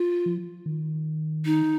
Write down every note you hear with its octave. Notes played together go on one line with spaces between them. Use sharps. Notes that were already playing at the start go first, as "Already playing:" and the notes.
Already playing: F4
F3
D#3
D#4